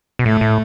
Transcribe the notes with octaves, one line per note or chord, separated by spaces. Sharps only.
B2
A2 A3
A2